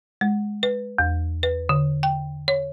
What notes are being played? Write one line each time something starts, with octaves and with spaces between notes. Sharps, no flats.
G#3
B4
E2
B4
D3
G5
C#5